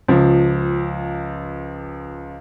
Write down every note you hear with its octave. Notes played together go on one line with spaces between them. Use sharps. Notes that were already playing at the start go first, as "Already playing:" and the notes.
C#2 F3